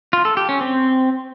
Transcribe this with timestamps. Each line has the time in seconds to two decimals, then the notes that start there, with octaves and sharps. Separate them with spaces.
0.13 F4
0.25 A4
0.37 G4
0.49 C#4
0.61 C4